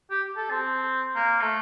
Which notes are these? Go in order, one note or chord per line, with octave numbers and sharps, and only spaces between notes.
G4
A4
C4
A#3
A3